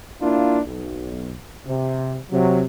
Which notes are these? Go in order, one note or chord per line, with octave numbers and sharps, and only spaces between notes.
A#3 D4 E4 F4
B1
C3
C3 F#3